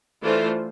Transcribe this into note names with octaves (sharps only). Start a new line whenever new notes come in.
E3 A3 D4 F4 C5